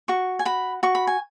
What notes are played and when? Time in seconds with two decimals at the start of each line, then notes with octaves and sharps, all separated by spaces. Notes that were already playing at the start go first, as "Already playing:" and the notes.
0.08 F#4 C#6
0.39 G#5
0.45 F#4 B5
0.83 F#4 C#6
0.95 B5
1.07 G#5